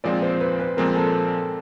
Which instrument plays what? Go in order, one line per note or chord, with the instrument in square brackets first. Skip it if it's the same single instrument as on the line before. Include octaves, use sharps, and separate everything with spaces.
[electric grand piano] A#2 F3 G#3 C4 [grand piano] D5
[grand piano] C5
B4
B4
[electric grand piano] A#2 F3 G#3 C4 [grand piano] A#4
[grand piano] A4